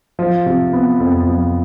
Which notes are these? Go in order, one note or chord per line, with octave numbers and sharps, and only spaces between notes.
F3
C3
B3
F2
F3